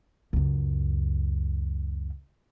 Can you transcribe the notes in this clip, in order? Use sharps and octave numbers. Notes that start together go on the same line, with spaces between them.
C#2 F#2